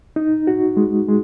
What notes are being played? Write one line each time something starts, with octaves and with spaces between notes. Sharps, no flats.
D#4
F#4
G#3
G#3